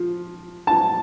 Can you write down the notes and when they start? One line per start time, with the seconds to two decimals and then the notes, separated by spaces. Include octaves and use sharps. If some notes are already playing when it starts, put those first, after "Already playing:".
Already playing: F3
0.67 A5